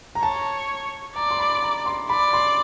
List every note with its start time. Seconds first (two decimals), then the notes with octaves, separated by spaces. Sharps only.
0.15 A#5
0.22 C#5 A5
1.16 D5 A#5
1.31 C6
1.39 B5
1.63 A#5
1.86 C6
2.10 D5 B5
2.33 C6